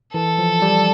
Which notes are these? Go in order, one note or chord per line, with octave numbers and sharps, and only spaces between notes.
E3 A4
F3
G3